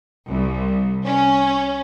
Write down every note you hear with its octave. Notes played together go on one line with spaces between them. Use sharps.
C2
C#4